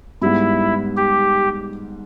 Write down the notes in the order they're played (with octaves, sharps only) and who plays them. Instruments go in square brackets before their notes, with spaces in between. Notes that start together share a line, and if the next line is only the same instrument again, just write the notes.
[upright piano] G#2 G3 B3 [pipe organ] E4
[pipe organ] G4